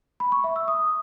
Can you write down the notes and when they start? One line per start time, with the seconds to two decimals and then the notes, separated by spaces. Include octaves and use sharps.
0.20 B5
0.32 C#6
0.44 E5
0.56 E6
0.68 D#6